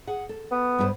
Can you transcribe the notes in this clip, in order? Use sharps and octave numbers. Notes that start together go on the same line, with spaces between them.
G#4 F#5
A4
B3
G2 G4 C5